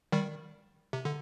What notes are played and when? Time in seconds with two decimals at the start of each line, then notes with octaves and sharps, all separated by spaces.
0.12 D#3 G3
0.93 C3
1.05 D3